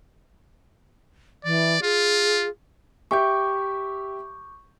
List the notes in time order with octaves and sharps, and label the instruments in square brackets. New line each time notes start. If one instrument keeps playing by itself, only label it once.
[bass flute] E3 [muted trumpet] D5
[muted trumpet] F4 [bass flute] G#4
[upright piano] G4 E5 [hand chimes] C#6 D6 G6